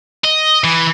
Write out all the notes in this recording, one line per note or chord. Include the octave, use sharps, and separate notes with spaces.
D#5
E3